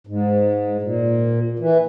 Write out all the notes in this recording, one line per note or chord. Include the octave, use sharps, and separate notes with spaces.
G#2
A#2
E3